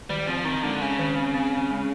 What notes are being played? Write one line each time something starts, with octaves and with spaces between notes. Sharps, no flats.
D#3 G3
F3 C4
D#3 C4
D3 G#3
C#3 G#3
D#3
C4
C4
C4
G#3